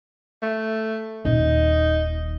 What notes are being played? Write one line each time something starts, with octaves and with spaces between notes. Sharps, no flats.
A3
D#1 D#2 D#4